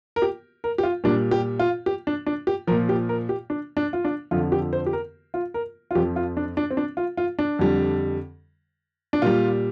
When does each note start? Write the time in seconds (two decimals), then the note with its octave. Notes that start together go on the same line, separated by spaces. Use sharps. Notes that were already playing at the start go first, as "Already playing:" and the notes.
0.16 A#4
0.22 G4
0.64 A#4
0.78 G4
0.83 F4
1.04 A#2 G3 D4
1.31 G4
1.60 F4
1.86 G4
2.07 D4
2.26 D4
2.47 G4
2.67 F3 A#4
2.71 A#2
2.89 G4
3.09 A#4
3.29 G4
3.50 D4
3.77 D4
3.93 F4
4.05 D4
4.31 F2 D3 F3 F4
4.52 G4
4.73 C5
4.86 G4
4.93 A#4
5.34 F4
5.54 A#4
5.91 F4
5.95 F2 G4
5.98 F3
6.16 F4
6.37 D4
6.57 D4
6.71 C4
6.77 D4
6.97 F4
7.17 F4
7.39 D4
7.59 F2 D3 G3
9.13 D4
9.22 A#2 G3 F4